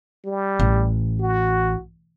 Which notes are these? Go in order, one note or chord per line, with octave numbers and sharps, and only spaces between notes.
G3
A1
F#4